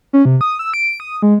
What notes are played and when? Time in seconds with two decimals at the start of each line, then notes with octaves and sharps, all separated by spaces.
0.13 C#4
0.25 C3
0.41 D#6
0.59 E6
0.74 D7
1.00 D#6
1.22 G#3